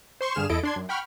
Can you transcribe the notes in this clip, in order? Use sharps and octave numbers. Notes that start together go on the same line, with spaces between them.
C5 C6 C#6
G2 D3 G#4 F6 E7
E2 E4 A4 D#5 D7
D4 C6 G#6
F#2
F#5 G5 B5 C#6 F6